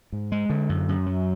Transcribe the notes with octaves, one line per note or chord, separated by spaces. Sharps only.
G#2
G#3
D3
F#2
F#2
F#3